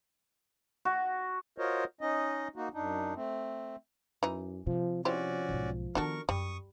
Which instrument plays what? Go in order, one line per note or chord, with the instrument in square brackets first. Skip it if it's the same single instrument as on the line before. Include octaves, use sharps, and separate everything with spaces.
[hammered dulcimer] F#4
[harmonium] F4 F#4 A#4 C5 C#5 D#5
C#4 D#4 D#5
A#3 D#4 F#4
F#2 D4 D#4
A3 C4
[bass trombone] F#2 [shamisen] E3 D#4
[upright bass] C3 [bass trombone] F3
[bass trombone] F3 [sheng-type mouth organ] C#4 F#4 D5 [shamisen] E4 G4 C5
[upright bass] B1 G#2
[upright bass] D#3 B3 [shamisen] D4 F#4 A4 [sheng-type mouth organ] A#4 C#6
[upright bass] F#2 [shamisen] G3 [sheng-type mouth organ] C#6 D#6